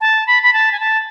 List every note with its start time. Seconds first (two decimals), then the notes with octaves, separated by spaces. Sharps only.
0.01 A5
0.27 B5
0.43 B5
0.53 A5
0.72 G#5
0.80 A5